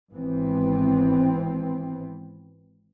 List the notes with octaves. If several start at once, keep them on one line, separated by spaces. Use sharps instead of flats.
G#1 E3 B3 C4